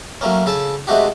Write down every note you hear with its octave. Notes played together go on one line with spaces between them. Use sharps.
F#3 A3 A#3 C#4
C#3 A4 G#5 A5
C3 G#3 A3 D4 F#4 G4